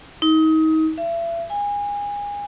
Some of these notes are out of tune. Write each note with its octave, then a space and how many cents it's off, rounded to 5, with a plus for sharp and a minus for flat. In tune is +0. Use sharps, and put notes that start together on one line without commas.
D#4 +30
E5 +35
G#5 -30